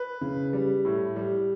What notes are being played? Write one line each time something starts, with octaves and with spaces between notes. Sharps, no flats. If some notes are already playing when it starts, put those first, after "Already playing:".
Already playing: B4
C#3
G3
A2
G3